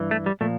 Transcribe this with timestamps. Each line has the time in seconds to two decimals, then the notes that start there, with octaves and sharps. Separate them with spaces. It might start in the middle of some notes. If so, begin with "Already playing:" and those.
Already playing: G2 E3
0.11 A3
0.26 G3
0.41 A#2 F3 A3